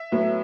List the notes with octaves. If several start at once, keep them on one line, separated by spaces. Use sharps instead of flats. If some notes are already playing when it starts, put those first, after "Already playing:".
Already playing: E5
A2 F#3 B3